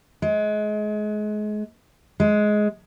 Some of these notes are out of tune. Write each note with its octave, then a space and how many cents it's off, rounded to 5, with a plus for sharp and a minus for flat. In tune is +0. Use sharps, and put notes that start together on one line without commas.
G#3 +30
G#3 +15